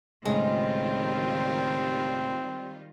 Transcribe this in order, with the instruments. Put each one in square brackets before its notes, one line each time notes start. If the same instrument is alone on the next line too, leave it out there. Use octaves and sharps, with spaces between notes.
[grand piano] C#2 A2 [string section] D#3 G3 F4 [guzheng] G#3 [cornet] C4